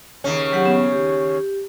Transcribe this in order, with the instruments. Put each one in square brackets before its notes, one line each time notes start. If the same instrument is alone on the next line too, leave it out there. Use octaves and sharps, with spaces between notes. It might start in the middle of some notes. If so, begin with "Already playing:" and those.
[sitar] D#2 C#3 C#4
[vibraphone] F#3 G4 F#5
B3
G4